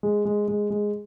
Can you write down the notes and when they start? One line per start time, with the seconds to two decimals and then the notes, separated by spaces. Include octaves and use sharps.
0.03 G#3
0.25 G#3
0.48 G#3
0.70 G#3